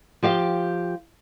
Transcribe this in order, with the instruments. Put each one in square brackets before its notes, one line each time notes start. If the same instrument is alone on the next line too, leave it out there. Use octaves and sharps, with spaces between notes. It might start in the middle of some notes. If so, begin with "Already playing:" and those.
[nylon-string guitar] F3 G4 F5 G5